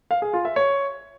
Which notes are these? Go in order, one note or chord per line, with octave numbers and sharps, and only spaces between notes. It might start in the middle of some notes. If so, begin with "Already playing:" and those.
F5
G#4
F4
E5
C#5